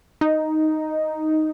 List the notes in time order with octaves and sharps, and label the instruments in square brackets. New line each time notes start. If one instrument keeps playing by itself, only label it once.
[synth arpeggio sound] D#4